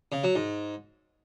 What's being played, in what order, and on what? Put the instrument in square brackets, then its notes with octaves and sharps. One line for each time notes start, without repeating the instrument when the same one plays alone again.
[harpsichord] C#3
F#3
G#2